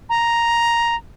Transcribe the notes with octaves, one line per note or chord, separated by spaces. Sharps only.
A#5